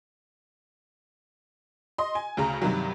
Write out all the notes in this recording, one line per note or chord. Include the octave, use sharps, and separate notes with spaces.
D#5 C6
G#5
D2 C#3 A#5
G2 C3 D#3 F#3